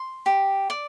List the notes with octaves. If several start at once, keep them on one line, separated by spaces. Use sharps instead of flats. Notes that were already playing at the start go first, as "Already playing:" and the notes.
Already playing: C6
G4
D5